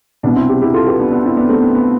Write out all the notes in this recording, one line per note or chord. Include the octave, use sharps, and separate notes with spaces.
C2 B2 B3 D4
C4 E4
E4 G4
E4 G4
F4 A4
G4 B4
B3 D4
B3 D4
C4 E4
B3 D4
A3 C4
B3
B3